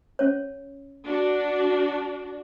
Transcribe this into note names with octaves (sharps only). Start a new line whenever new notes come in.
C#4 C#5
D4 F#4